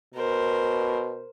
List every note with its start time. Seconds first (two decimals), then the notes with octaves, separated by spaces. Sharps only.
0.14 B2 A#4 C5